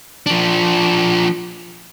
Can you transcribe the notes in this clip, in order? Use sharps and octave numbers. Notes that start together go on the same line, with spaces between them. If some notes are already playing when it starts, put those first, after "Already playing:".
F3 D4